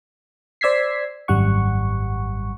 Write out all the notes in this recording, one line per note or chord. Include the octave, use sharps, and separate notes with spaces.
C5 D5 E6 G#6 B6 C7
G#1 F#2 G3 F#5 C#6